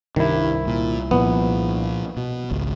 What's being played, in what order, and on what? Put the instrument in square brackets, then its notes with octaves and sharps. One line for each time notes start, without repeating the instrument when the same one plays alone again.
[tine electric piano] C2 E4 [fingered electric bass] G2 [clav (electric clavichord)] D#3
[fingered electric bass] A#2
[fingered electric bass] A#2 F3 [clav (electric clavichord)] B3
[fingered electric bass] B2
G#1 C#2